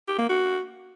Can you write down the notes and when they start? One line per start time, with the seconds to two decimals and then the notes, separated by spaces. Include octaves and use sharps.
0.08 G4
0.19 A#3
0.29 F#4